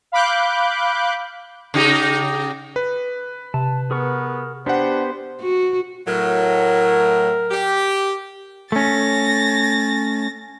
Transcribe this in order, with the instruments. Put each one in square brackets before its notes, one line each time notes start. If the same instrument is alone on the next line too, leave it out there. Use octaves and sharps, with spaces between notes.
[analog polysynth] F5 B5 D6 F#6 G6
[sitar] C#3 D#4 G4
[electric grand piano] B4
[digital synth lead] C3 [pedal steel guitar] A5
[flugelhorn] B3 [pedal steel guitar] G#4 A#4 C#6
[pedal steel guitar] B3 G4 [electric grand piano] D4 F#5 [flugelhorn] C5
[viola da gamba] F#4
[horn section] A2 F#3 [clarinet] A#4
[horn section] G4
[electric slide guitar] A3 C#4 [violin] A6 A#6